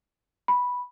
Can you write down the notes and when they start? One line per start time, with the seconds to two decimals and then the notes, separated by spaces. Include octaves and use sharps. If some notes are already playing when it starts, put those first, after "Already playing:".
0.48 B5